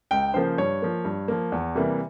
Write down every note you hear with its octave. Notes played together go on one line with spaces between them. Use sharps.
C#2 G5
C#3 F3 A#3 C5
G2 C#5
F3 A#3
G2
F3 A#3
E2
C3 E3 G3 A#3